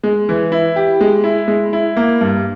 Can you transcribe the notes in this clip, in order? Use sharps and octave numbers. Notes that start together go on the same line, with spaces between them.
G#3
E3
E4
G4
G#3
E4
G#3
E4
A#3
G2